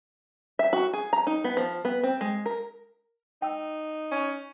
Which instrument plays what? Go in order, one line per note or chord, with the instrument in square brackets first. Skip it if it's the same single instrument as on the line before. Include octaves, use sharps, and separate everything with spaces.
[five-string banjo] E5
F#4
G#4
A#5
D#4
B3
F3
B3
C4
G#3
A#4
[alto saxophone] D#4 [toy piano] G5 E6
[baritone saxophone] C#4